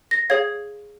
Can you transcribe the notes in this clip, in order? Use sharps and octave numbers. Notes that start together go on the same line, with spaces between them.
A#6
G#4 C#5 F5 G#6